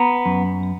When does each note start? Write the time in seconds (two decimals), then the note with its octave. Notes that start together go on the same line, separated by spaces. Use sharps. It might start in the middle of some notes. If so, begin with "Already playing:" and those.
Already playing: B3 A#5
0.26 F#2